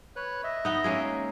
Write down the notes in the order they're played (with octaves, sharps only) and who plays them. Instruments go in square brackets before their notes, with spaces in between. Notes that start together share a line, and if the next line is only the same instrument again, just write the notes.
[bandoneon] B4 C#5 F#6
D#5 E5
[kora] B3 D#4
G#3 A#3 C#4